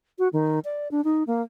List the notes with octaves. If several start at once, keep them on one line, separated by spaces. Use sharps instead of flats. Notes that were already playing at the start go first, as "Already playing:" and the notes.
F#4
D#3
D5
D4
D#4
A#3